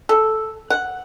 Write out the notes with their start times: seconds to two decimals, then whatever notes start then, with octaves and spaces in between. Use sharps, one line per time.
0.09 A4
0.70 F#5